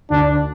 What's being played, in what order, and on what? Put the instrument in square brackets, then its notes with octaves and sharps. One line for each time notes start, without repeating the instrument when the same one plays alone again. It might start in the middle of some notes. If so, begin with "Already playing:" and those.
[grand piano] D2 [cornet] D4